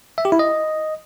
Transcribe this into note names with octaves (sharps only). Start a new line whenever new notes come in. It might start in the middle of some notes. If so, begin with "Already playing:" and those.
E5
G4
E4
D#5